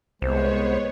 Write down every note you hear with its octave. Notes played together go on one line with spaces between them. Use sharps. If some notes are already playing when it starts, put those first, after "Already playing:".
C2 G#3 B3 C5 C#5